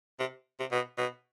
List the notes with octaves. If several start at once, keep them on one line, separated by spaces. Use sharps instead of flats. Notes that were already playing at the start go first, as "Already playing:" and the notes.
C3
C3
B2
B2